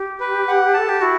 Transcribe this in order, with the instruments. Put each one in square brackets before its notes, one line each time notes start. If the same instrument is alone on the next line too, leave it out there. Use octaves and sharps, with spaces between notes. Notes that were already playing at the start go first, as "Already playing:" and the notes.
Already playing: [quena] G4
[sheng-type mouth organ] B4
F#5
[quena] A4 [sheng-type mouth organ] A5
[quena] G4
[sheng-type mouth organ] E4 [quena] F#4